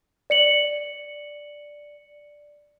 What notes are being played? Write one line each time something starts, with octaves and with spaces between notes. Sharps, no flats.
D5 C#7 F#7